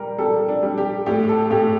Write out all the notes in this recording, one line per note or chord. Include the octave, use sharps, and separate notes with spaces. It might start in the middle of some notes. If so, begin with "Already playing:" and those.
Already playing: G3 A#4
G3 A4
D4
G3
G4
A2 G4
A4
A2 G4